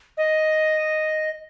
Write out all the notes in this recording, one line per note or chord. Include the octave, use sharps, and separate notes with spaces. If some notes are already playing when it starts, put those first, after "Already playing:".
D#5